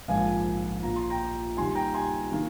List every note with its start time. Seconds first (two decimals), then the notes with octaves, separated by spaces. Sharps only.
0.08 A#1 G#2 F3 A#3 F5 G#5
0.83 A#1 A#2 F3 A#5
0.96 C6
1.10 G5 A#5
1.57 D#2 D#3 G3 G#5 C6
1.75 G5 A#5
1.94 G#5 C6
2.32 D#3 A#3